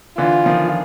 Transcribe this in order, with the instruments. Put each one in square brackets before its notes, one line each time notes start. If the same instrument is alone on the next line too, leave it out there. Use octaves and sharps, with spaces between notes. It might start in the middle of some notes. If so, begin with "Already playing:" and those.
[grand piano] D3 E3 [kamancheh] F4
[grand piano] D#3 F3